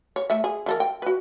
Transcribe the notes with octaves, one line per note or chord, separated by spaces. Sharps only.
C#5
A3 E5
G#4
E3 A4 A#4
G5
F#4 B4